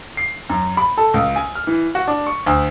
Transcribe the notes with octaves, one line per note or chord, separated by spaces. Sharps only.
C7
F#2
B5
A4
C#2
G#5
F6
E3
F#4
D4
C#6
D2